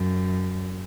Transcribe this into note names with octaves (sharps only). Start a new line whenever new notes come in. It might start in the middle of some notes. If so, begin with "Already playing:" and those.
Already playing: F#2